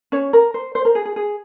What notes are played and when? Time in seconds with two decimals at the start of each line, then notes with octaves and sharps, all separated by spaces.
0.12 C#4 C#5
0.33 A#4
0.54 C5
0.75 C5
0.85 A#4
0.95 G#4
1.05 G#4
1.16 G#4